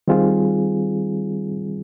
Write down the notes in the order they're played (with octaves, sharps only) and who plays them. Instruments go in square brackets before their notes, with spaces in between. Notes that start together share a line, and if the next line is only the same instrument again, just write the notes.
[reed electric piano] D#3 G3 C4 F4 G#4